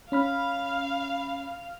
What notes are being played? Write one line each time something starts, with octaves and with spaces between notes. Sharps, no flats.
C#4 F5 B5 F6